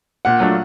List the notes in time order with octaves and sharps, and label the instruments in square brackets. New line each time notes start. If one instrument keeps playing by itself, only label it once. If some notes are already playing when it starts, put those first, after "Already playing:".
[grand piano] A#2 [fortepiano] F#5
[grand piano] F#3 A3 D4 F4